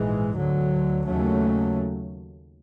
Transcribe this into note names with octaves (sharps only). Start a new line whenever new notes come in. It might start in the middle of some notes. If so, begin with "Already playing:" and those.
Already playing: A#1 G#2 E3 G#3
D2 D3 F#3
D#2 C#3 F#3 A3 C#4